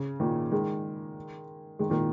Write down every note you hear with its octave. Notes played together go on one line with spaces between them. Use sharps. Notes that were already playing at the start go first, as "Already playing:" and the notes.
Already playing: C#3
A#2 D#3
D#3 G#3
D#3 G#3
A#2 D#3